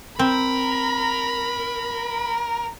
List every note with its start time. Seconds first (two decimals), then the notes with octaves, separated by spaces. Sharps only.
0.19 C4 A#4 B5